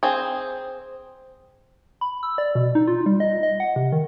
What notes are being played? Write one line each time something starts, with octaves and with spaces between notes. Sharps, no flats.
C4 G#4
B5
E6
D5
B2
D#4
F4
G3
D#5
D#5
F#5
C3
D#3